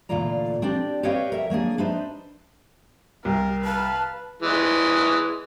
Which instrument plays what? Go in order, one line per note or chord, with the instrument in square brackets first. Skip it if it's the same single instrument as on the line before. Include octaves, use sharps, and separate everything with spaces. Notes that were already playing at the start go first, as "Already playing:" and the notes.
[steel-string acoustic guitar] D2 A#2 E3 F4 D5 A#5
C4 D4 G4 D5
G4 B4 C#5 D#5 F5 G5
A#4 E5
F#3 A#3 D4 G#4
D4 D#4 B4 C5 E5
[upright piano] C2 [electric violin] A#4
[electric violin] B4 F5 [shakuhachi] A5
[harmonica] E3 G#3